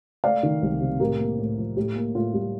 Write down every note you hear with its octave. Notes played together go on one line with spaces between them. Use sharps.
A3 D5 F5
D#3
C2
C3
A2 G4 A#4
A#3
A2
F3
A2 G4
A#3
A2 F4
G3